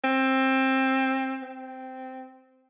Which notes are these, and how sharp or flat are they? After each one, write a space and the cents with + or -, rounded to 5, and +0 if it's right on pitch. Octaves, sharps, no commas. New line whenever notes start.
C4 +20
C4 -10